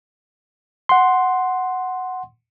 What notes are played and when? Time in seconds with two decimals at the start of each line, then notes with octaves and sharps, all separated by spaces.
0.89 F#5 C6